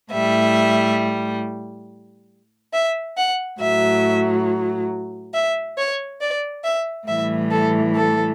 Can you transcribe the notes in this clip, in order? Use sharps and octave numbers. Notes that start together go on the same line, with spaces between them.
A2 G3 E5
E5
F#5
A2 F#3 E5
E5
C#5
D5
E5
A2 E3 G3 E5
A4
A4